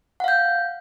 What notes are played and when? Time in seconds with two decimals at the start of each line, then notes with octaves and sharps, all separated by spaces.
0.20 F#5
0.24 F5
0.28 G6